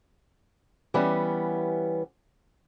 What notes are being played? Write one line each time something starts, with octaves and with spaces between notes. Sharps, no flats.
E3 G3 B3 C#4 G4